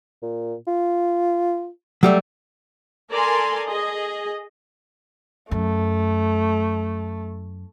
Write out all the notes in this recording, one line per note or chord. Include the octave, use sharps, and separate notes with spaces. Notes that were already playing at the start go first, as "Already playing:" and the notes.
A#2
F4
F#3 G3 A3
A4 A#4 D5 G#5 A#5 C6
G#4 D#5
F#2 A3